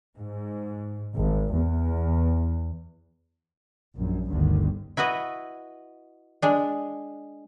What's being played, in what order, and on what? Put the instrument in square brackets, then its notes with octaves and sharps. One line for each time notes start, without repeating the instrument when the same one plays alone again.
[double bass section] G#2
G#1
E2
A#1 F#2
G1 D2 G2 D3 D#3
[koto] E4 F#4 B4 D#5
G#3 D4